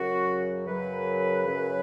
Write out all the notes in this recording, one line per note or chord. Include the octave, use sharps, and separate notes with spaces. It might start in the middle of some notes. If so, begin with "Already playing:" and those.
Already playing: F#2 C#3 F#3 F#4
F#2 C#3 F#3 B4
F#2 C#3 F#3